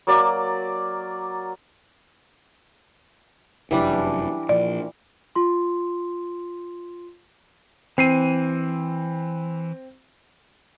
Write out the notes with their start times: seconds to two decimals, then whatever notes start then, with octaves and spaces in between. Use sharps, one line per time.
0.07 F#3 A#3 D5 A#5
3.71 F1 F#2 E3 G3 D4
4.49 A#2 F3 D5
5.36 F4 C6
7.98 E3 C4 C7 D#7